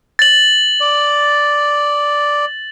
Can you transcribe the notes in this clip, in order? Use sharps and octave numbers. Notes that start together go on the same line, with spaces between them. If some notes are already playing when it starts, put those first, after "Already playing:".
A6 F#7
D5